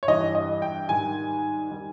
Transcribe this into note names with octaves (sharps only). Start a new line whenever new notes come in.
C#5
G2 E3 G3 D#5
D#5
G5
G#2 D#3 G3 G#5
D#3 G3